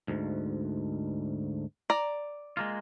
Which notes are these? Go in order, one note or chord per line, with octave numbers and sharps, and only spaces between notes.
D2 G#2
D5 A#5
G#3 A#3 F4